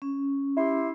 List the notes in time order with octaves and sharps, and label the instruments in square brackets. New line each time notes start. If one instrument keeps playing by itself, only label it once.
[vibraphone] C#4
[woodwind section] E4 G4 C6